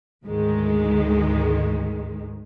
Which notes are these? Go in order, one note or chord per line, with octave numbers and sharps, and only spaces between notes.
D2 G#2 D#3 G#3